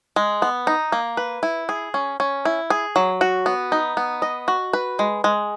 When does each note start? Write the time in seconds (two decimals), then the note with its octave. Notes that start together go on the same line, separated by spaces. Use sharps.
0.16 G#3
0.42 B3
0.67 D#4
0.92 A#3
1.17 B4
1.43 E4
1.69 G#4
1.94 C#4
2.20 C#4
2.45 E4
2.70 G#4
2.96 F#3
3.21 F#4
3.46 B3
3.72 D#4
3.97 B3
4.22 D#5
4.48 F#4
4.73 B4
4.99 G#3
5.24 G#3